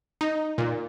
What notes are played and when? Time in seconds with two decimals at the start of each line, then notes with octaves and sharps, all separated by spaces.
0.21 D#4
0.58 A#2